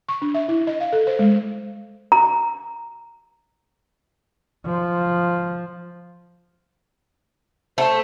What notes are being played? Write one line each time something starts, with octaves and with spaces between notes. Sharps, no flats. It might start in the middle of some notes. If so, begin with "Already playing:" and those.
C#6
D4
E5
E4
D#5
F5
A4
C5
G#3
A#5
F3
A3 C5